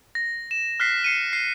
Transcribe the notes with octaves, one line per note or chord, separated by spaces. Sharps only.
A#6
E7
F6 F#6 B6 C7
C7 C#7 D#7
C7